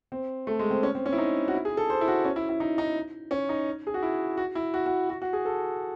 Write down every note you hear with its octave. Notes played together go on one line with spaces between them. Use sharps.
C4
A3
G#3
C4
C#4
C4
C#4
E4
D#4
F#4
E4
G#4
A4
C5
E4
F#4
C#4
E4
E4
D#4
D#4
C#4
D#4
G#4
F#4
E4
F#4
E4
F#4
F#4
F#4
F#4
G#4
A4